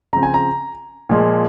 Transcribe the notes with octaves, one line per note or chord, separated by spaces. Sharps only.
C#3 F3 C4 A#5
G#5
A#5
A#2 F3 G#3